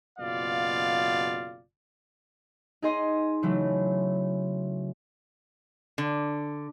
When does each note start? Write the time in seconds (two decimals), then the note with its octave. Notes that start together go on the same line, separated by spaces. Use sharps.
0.19 F#1 B2 F4 D5 F5
2.82 D#4 G#4 D#5 C6
3.43 C#3 E3 F#3 A3
5.98 D3